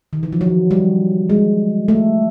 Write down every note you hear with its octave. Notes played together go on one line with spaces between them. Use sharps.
D#3
E3
F3
F#3
G3
G#3
A3